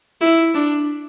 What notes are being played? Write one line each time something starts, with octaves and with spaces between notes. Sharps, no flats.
E4
D4